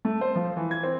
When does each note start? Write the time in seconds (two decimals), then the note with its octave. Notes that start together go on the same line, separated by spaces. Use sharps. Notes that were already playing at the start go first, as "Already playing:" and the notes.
0.05 A3
0.21 C5
0.36 F3
0.57 E3
0.71 G#6
0.83 C4